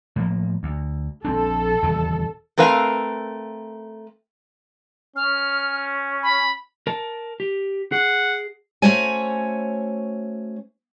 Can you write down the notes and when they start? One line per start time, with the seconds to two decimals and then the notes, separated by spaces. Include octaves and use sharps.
0.16 A2 F3 A#3
0.63 D2
1.25 A#1 C4 D4 A4
1.83 D#1 E2 C#3
2.58 A3 C4 A#4 B4 F5
5.16 C#4 F6
6.23 B5
6.87 A#4 A5
7.40 G4
7.92 G#4 F#5
8.82 A3 C#4 F#4 C5 C#5 G#5